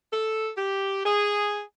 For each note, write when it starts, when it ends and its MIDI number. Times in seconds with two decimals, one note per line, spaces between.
0.13 0.51 69
0.57 1.03 67
1.06 1.63 68